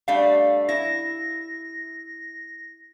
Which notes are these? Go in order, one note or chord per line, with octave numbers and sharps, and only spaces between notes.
G3 A3 D4 F5
E4 A#6